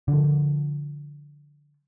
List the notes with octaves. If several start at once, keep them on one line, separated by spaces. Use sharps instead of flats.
D3 F3